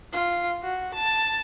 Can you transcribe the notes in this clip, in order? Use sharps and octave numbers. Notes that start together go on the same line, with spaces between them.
F4
F#4
A5